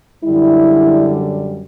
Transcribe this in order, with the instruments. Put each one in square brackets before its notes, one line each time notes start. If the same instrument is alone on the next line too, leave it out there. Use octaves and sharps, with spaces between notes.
[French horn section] F#2 D3 G3 E4